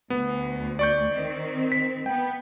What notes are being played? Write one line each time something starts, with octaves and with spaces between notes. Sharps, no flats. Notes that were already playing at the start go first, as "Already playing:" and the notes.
D2 B3
D5 C#6 G6
D#3 C4
B6
B3 G5